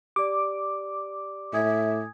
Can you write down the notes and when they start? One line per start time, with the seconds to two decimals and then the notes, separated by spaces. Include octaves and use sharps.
0.16 G4 D5 D6
1.54 A2 E5 G#5 D#6 G#6